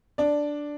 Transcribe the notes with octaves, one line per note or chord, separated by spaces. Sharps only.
D4 D5